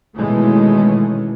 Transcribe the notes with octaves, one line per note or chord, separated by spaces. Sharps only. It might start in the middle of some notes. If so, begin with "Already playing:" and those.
B2 D#3 E3 G#3 A3 C#4